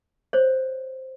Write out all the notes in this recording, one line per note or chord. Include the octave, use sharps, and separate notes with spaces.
C5 C#5